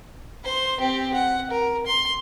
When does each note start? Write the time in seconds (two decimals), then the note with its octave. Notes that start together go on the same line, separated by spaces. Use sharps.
0.44 C5 C6
0.80 C4 G4
1.14 F#5
1.51 A#4
1.87 C6